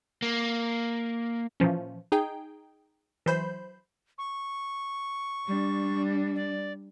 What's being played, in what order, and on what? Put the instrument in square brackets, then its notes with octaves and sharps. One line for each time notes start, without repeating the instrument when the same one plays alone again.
[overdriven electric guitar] A#3
[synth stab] A#2 E3 F3 C#4
D#4 G#4 G5
E3 F#3 C5 B5 G6
[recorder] C#6
[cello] G3 D4
[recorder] D5